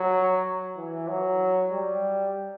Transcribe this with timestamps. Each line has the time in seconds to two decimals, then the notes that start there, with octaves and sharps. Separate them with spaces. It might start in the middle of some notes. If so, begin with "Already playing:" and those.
Already playing: F#3
0.76 E3
1.08 F#3
1.71 G3